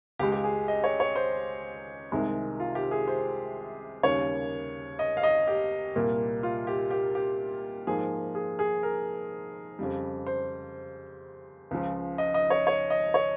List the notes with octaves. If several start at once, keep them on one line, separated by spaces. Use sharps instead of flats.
C#2 C#3 G#3 G4
G4
G#4
D#5
C#5
C#5
C5
C2 C3 D#3 G#3
F4
G4
G#4
C5
D#2 C#3 G3 A#3 C#5
D#5
F5
D#5
G4
C2 A#2 G3 A#3
F4
G4
G4
G4
G#2 F3 A#3 G#4
G#4
G#4
A#4
F2 C#3 G3
C5
C#2 C#3 F3
D#5
D#5
C#5
C#5
D#5
C#5